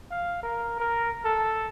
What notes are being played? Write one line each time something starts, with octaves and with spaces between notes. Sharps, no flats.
F5
A#4
A#4
A4